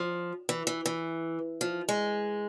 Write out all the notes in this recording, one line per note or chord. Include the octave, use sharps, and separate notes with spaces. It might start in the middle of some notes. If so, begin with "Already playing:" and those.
Already playing: F3
E3
E3
E3
F3
G#3